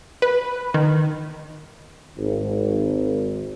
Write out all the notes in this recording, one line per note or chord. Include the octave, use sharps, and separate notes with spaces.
B4
D#3
G#1